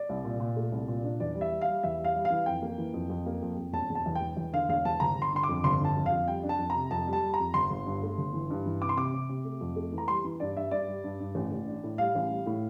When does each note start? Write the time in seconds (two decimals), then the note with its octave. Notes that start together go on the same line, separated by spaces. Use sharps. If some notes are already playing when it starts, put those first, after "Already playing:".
Already playing: D5
0.09 C2
0.24 A#2
0.40 A#2
0.56 A3
0.72 C2
0.88 A#2
1.04 D4
1.20 E2 D5
1.35 G3
1.41 E5
1.52 G3
1.61 F5
1.67 G3
1.83 E2 E5
1.99 G3
2.04 F5
2.15 G3
2.25 F5
2.30 E3
2.46 F2 G5
2.62 A#3
2.78 E3
2.94 F2
3.10 F2
3.26 A#3
3.42 F2
3.58 F2
3.73 E1 A5
3.90 E1
3.95 A5
4.06 E2
4.15 G5
4.21 E1
4.37 E2
4.53 D3 F5
4.69 E1 F5
4.85 E2 A5
5.00 G1 A#5
5.16 G1
5.22 C6
5.33 D3 C6
5.44 D6
5.49 F2
5.64 G1 C6
5.79 D3
5.85 A5
5.96 F2
6.06 F5
6.12 F2
6.28 G3 G5
6.43 D4
6.49 A5
6.59 F2
6.70 A#5
6.75 C3
6.91 F2 A5
7.07 G3
7.13 A5
7.23 G3
7.34 A#5
7.39 F2
7.54 G1 C6
7.70 G1
7.86 G2
8.03 A3
8.18 G1
8.33 E3
8.50 G2
8.66 E3
8.81 C3 D6
8.89 C6
8.97 C3 D6
9.14 C3
9.29 C3
9.45 A3
9.61 F2
9.76 A3
9.92 E3
9.98 A#5
10.08 G3 C6
10.24 E3
10.40 G2 D5
10.56 G2 E5
10.71 G2 D5
10.88 G3
11.04 G2
11.20 G2
11.35 A1
11.52 A1
11.68 D4
11.84 A2
11.98 G3 F5
12.15 A1
12.30 G3
12.46 A2